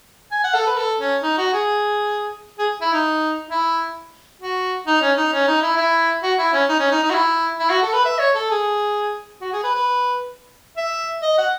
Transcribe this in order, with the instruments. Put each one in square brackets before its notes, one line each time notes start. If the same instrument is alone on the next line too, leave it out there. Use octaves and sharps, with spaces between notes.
[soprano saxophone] G#5
F#5
A4
B4
A4
C#4
D#4
F#4
G#4
G#4
E4
D#4
E4
F#4
D#4
C#4
D#4
C#4
D#4
E4
E4
F#4
E4
C#4
D#4
C#4
D#4
D#4
F#4
E4
E4
F#4
A4
B4
E5
C#5
A4
G#4
F#4
G#4
B4
B4
E5
D#5
F#5